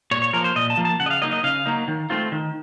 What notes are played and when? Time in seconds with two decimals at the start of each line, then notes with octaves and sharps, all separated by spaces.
0.11 A#2 C#5
0.22 C#5
0.33 F3 A#3 A#4
0.44 C5
0.56 A#2 D#5
0.70 A5
0.77 F3 A#3
0.85 A5
1.00 C#3 F#5
1.06 D#5
1.10 F5
1.22 F#3 A#3 D#4 D#5
1.33 D#5
1.44 C#3 F5
1.66 F#3 A#3 D#4
1.88 D#3
2.10 A3 C4 F4
2.32 D#3